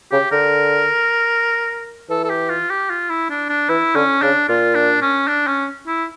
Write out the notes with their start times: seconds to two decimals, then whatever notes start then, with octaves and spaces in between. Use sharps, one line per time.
0.11 C#3 G4
0.32 D3 A#4
2.10 E3 A4
2.24 A4
2.30 G4
2.50 F4
2.70 G4
2.90 F4
3.10 E4
3.30 D4
3.49 D4
3.69 E3 E4
3.95 D3 C#4
4.22 C#3 D4
4.49 A#2 F4
4.75 D4
5.02 C#4
5.28 D4
5.47 C#4
5.87 E4